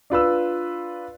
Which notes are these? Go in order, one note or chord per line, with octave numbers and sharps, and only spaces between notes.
D4 F4 B4 E6